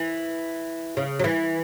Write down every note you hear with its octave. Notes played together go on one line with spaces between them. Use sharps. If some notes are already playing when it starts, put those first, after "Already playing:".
Already playing: E3
C#3
F#3
E3